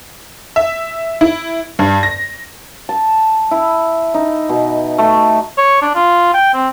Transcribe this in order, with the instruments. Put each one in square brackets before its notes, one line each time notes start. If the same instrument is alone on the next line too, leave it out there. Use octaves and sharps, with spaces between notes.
[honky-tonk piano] E5
E4
G2
A#6
[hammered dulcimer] A5
E4
D#4
B2
A3
[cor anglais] C#5
D4
F4
G5
C4